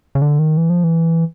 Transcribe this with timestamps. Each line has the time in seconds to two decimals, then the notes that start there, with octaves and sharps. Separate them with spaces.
0.15 C#3
0.22 D3
0.39 D#3
0.57 E3
0.70 F3
0.84 E3